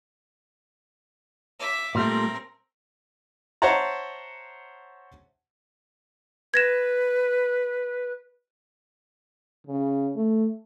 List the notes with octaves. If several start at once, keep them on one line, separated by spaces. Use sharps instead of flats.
E5 D6
A#2 G3 A3 C4 A#4
C5 C#5 E5 F#5 A5 A#5
B4 G#6 A#6 E7
C#3
A3